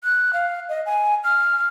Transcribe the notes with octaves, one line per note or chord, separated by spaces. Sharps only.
F#6
F5
D#5
G#5
F6